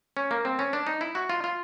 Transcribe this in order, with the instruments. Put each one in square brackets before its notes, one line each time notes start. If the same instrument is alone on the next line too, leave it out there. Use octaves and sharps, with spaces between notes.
[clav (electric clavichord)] C#4
A#3
C4
C#4
D4
D#4
E4
F#4
F4
F4